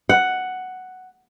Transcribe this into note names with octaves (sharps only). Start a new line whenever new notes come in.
F#5